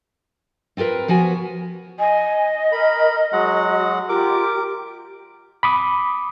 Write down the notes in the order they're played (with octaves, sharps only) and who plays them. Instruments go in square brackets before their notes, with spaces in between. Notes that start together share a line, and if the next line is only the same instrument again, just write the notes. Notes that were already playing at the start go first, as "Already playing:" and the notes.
[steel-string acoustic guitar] C4 F4 F#4 A#4 B4
F3 B3 F#4 G#5
[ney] D#5 [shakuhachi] G#5
[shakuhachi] A#4 [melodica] B5
[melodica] F#3 G#3 F#5 [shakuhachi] F#4
[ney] F4 [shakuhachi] G4 [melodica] A#4 D6
[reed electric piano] B5 D6 D#6